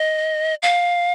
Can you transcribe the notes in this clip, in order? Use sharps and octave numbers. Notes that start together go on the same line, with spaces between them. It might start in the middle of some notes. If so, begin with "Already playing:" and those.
Already playing: D#5
F5